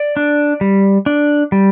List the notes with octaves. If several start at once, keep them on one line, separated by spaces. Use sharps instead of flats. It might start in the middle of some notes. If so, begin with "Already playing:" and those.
Already playing: D5
D4
G3
D4
G3